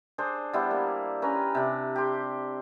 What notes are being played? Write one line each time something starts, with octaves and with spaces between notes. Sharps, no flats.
D4 G#4 C5
G3 B3 E4 C5
A#3
C#4 B4 G#5 A#5
C3 D4
G4 C6